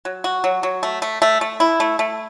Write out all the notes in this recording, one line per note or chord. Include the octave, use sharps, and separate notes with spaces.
F#3
F#4
F#3
F#3
A3
A3
A3
A3
E4
A3
A3